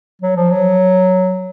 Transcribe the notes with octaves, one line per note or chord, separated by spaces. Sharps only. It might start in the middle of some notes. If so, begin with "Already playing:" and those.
F#3
F3
F#3